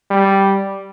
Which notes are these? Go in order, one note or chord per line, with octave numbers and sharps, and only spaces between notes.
G3